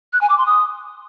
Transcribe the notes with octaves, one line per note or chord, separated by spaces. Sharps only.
F#6
G#5
D6
C6
D#6